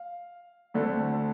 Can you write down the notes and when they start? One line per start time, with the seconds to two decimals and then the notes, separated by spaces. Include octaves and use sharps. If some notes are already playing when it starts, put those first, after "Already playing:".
Already playing: F5
0.74 D2 D3 A3 C4